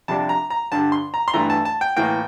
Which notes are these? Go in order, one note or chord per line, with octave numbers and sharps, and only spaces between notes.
F2 C3 G3 D4 A5
A#5
A#5
G2 D3 G3 A5
C6
A#5
C6
G2 E3 A3 A#5
A5
A5
G5
A2 E3 A#3 G5